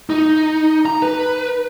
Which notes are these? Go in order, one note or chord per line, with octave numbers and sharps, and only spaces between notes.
D#4
A#5
B4